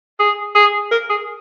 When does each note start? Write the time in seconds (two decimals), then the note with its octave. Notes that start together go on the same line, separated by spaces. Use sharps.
0.19 G#4
0.55 G#4
0.91 A#4
1.09 G#4